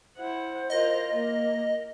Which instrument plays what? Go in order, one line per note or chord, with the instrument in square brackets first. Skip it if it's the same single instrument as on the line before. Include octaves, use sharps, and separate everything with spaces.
[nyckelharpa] E4 F#5 [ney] C5
[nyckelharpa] F4 A#4 [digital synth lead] D#5
[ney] A#3 [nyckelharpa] A#4